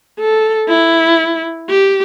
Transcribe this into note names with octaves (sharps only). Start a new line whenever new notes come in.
A4
E4
G4